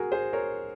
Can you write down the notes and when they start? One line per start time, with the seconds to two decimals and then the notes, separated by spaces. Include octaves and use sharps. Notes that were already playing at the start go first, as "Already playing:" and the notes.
Already playing: F#4 G#4 A#4
0.12 G#4 C5
0.33 A#4 C#5